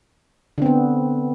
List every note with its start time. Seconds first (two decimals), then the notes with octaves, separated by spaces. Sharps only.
0.58 D3
0.62 C4
0.66 B3